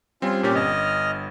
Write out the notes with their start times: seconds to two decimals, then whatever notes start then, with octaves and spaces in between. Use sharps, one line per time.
0.22 G3 C4 C#4 F4
0.43 A#2 C4 C#4 G4
0.55 G1 D#5 F6